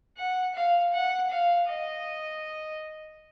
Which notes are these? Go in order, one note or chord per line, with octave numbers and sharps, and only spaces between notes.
F#5
F5
F#5
F5
D#5